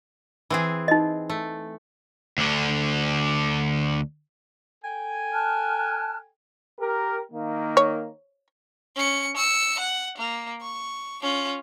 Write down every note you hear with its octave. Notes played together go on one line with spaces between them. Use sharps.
E3 C4 G#4
D#4 D#5
A3
D2 D3
A4 G5 G#5
A5 F6 F#6
G4 A#4
D#3 A#3
C#5
C#4 C#7
E6 C#7
F#5
A#3
C#6
C#4 F4